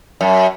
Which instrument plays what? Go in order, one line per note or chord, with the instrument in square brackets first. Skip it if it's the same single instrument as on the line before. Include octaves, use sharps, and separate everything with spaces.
[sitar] F#2